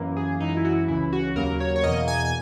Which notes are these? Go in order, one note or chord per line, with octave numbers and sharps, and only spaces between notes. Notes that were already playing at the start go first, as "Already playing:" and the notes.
Already playing: F#2 E3 A#3
G#4
F#2 E3 G#3 D#4
E4
F#4
E4
C#2 C#3 E3 E4
F#4
D#2 C#3 F#3 A#3 A#4
C#5
C#5
E2 B2 A#3 D#5
G#5
G#5